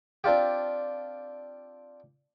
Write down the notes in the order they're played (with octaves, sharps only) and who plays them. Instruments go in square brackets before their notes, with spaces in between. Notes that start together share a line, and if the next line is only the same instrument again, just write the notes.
[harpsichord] C4 D4 F4 G4